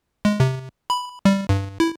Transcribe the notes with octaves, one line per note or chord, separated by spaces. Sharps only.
G#3
C3
B5
G3
G2
E4